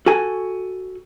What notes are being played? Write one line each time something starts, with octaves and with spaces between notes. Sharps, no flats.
F#4 A4 G#5